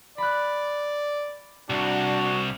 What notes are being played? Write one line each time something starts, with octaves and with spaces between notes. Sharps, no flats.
D5 B5 F#6
C2 D4 F#4